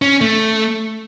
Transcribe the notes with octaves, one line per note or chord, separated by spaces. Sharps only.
C#4
A3